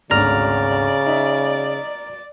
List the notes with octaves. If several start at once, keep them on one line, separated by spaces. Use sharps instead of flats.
G#1 D2 C#3 D5 A#5 F6
D#4 E5